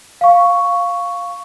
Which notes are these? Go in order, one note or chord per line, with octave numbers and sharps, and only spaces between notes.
F5 C#6